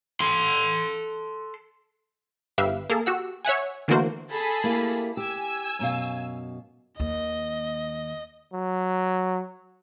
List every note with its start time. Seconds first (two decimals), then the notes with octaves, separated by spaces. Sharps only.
0.21 A4 C6
2.58 G1 G4 B4 E5 F5
2.90 A#3 G#4 A4
3.06 F#4 G4 F#5 E6
3.45 C#5 E5 F#5 G#5
3.88 D3 E3 A3 A#3 F#4 C5
4.31 G#4 A4 B5
4.64 A#3 E4 G4
5.17 G4 G#5 E6
5.79 F#2 B2 F5
7.00 D#2 A#3 D#5
8.53 F#3